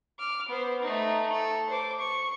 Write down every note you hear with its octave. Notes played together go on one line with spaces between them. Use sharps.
D6 F6
B3 C5
A3 D#4
A4
C5 D6
C#6